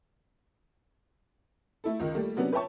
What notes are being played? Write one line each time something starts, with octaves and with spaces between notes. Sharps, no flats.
A3 E4 A4
C#2 D#3
G3 A3 A#3
C3 F#3 B3 C#4 D4
B4 C#5 E5 G5 A5 C#6